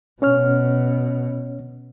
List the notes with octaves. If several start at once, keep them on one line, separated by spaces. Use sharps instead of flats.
B2 C#4 C#5 F6